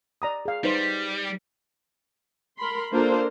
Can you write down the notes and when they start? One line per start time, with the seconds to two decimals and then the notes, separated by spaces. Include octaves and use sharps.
0.22 D5 A#5 D#6
0.45 G#4 F5
0.64 G3 D#4 B4 C5
2.58 A#4 B5 C6
2.92 A#3 D4 F4 A4 A#4 C5